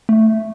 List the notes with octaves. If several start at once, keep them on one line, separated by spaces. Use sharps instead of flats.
A3